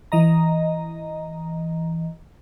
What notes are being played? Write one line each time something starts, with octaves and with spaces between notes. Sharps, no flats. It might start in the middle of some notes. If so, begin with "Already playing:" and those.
E3 D#5 A#5